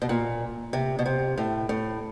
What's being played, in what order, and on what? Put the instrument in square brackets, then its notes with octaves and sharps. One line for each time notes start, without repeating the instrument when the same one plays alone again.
[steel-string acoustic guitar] B2
A#2
C3
B2
C3
A2
A2